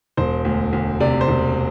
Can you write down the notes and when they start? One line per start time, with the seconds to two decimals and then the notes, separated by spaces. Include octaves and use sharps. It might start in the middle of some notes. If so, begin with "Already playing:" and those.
0.17 E1 C5
0.45 D2
0.73 D2
1.00 C3 D5
1.21 C5
1.28 E1